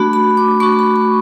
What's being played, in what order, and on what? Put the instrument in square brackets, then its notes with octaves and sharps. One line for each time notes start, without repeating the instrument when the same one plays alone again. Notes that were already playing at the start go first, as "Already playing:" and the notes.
Already playing: [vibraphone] A3 D4 F#4 B5
B5
D6
A3 D4 F#4 C#6
B5
C#6